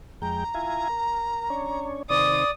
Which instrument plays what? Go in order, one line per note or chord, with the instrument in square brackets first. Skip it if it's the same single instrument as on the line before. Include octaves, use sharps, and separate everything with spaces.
[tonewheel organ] F2 G#3 G5 [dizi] A#5
[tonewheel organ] E4 F4 G#5
A#4
C#4 D4 C#5
[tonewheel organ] C3 D#3 C5 [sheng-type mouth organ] D5 [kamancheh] D#6